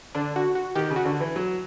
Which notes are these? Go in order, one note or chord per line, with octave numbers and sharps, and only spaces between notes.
D3 D4
F#4
F#4
D#3 G4
C#3
F#4
D3
E3
F#3